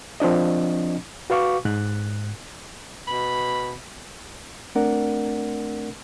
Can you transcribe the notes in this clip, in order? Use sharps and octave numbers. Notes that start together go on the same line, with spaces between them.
F3 C4 D4 D#5
F#4 B4 F5 C#6 D6
G#2 F#6
B2 B5
A3 C4 D4 A#4 D5 F#5